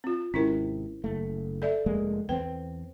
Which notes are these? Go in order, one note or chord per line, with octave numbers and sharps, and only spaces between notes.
C4 F4
G#1 C3 C#4 E4 A#4
F#1 A3
A4 D5 E5
F1 G#3 A#3
E2 B3 C4 B4 G5